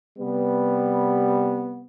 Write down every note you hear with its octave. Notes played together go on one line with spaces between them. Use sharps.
C3 G3 B3